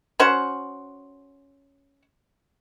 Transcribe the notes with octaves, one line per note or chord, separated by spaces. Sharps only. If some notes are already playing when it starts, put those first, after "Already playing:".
C#4 F#4 C5 F#5